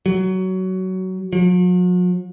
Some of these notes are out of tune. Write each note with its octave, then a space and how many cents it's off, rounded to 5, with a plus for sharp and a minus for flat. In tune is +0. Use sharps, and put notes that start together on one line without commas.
F#3 +15
F#3 -45